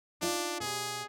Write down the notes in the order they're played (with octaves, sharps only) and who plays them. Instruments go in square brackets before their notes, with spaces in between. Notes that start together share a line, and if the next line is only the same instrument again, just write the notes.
[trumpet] D4 [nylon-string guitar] D#4 F4 D5
[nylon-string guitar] B2 G4 [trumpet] G#4